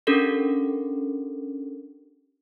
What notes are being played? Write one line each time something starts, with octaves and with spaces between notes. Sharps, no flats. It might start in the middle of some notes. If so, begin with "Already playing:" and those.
C#4 D4 G4 A4 A#4